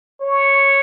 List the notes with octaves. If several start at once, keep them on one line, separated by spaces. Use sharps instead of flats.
C#5